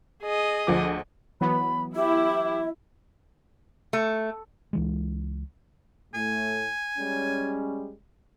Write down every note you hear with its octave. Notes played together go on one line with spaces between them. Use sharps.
G#4 D#5
D2 F3 D6
E3 F#3 B3 B5
E4 G4 E5
A3
C#2 E3 G#3
A2 A3 G#5
G3 G#3 C#4